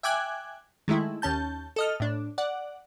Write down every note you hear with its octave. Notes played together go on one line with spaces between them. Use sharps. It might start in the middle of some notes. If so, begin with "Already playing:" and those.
E5 G5 G#5 D6 F#6 G#6
D#3 G#3 A3 E4
D#2 C#4 A5 G6
A4 D#5 F6
A2 D4
D5 F#5